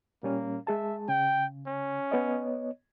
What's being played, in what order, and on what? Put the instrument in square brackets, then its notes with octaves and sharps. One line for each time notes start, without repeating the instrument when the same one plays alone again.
[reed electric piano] A#2 G3 C#4 [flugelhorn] A#3
[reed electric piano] G#3 G#4 A5 [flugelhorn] E5
[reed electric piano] C#3 [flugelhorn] G5
[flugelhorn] C#4
[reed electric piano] B3 C#5 D#5